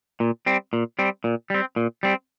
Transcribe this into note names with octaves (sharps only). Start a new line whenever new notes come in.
A#2
G3 C4
A#2
G3 C4
A#2
G3 C4
A#2
G3 C4